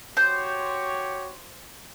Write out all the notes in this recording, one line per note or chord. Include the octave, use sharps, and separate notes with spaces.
F#4 G4 C5 C#5 G6